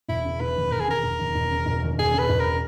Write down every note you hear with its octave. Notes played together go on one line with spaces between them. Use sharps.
E1 E4
C#3
E1 B4
D#2
E1 A#4
G#4
C#3 A#4
E1
D#2
E1
C#3
E1
D#2
E1 G#4
C#3 B4
E1
A#4